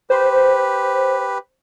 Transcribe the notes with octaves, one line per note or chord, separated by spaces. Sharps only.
G4 B4 C5